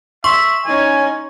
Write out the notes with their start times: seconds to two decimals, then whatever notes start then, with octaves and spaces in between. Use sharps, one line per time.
0.24 E5 C6 C#6
0.65 C#4 D#4 G#5